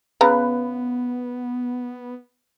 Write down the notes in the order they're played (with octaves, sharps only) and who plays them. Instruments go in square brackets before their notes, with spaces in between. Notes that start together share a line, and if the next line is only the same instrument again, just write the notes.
[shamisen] C#3 A#5 [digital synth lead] B3 [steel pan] B4